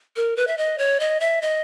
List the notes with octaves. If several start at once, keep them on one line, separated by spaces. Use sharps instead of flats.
A#4
B4
E5
D#5
C#5
D#5
E5
D#5